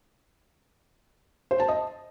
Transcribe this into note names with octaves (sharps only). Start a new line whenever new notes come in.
C5
A5
D#5